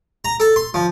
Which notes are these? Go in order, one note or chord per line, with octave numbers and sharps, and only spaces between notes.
A#5
A4
C6
F3